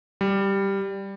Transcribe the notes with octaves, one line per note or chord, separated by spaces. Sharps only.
G3